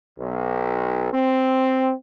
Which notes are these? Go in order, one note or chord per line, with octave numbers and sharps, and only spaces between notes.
B1
C4